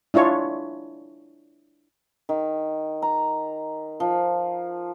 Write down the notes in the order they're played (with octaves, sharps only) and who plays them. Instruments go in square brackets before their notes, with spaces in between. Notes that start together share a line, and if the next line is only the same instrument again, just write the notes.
[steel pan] D4 E4 F4 C#5
[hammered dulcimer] D#3
A#5
F3